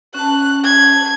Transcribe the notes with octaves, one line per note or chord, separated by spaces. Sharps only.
C#4 A5 F#6
G#6